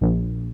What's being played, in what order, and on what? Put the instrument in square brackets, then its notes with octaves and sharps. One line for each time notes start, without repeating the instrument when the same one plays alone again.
[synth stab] A#1